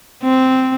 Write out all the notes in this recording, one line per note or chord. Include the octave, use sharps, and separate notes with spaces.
C4